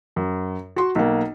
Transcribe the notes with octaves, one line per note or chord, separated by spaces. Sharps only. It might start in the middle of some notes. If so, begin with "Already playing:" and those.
F#2
F#4 C6
B1 A#3